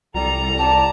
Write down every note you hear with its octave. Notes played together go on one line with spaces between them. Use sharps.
C2 G3 A4 A#5
G4 D5 A5